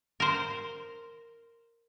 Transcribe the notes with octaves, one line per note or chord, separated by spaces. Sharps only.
A#4 C5